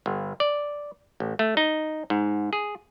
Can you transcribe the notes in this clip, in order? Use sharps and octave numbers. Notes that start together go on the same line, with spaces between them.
G1
D5
A1
A3
D#4
G#2
G#4